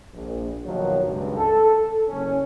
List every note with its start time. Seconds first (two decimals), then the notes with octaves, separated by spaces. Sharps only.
0.14 A#1
0.65 D#2 B2 D#3 F3 F#3
1.04 C#2 G2
1.36 A4
1.65 A4
2.08 F#1 C#4